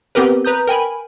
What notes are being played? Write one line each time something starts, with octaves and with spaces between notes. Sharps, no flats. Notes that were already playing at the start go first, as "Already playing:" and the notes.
B3 C4 G4 A#4 B4
B4 A#5 D#6 G6
A#4 G5 G#5 B5